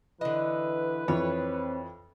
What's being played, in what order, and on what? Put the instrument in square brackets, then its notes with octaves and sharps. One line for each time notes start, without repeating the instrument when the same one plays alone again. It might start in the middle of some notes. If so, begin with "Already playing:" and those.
[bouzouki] D3 D#5 [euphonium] E3 [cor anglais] B4
[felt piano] F2 E3 [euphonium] C4 [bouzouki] C#5